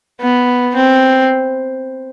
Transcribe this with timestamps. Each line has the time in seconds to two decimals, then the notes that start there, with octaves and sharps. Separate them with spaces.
0.21 B3
0.75 C4